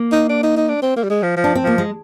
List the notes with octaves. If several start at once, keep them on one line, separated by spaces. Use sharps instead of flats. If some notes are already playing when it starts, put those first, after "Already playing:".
Already playing: A#3
D#4
D4
D#4
D#4
D4
C4
A#3
G3
G#3
F3
F3
D4
C4
F3 A#3
G#3